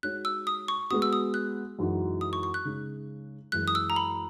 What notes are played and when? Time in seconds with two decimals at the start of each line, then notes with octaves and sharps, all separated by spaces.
0.03 G#3 D#4 F#4 C#5 F#6
0.25 E6
0.47 D#6
0.68 C#6
0.91 G#3 B3 F#4 D#6
1.02 E6
1.13 D#6
1.34 F#6
1.79 F#2 E3 G#3 D#4 F#4
2.21 D#6
2.33 C#6
2.43 C#6
2.54 F#6
2.65 C#3 G#3 D#4
3.52 F#2 E3 G#3 F#6
3.68 D#6
3.75 E6
3.90 A#5
3.96 B5